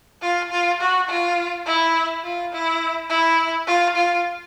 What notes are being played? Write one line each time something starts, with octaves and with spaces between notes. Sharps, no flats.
F4
F4
F#4
F4
E4
F4
E4
E4
F4
F4